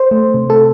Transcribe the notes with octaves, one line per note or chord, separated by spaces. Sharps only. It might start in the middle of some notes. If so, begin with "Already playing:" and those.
Already playing: C5
A3
C3
A4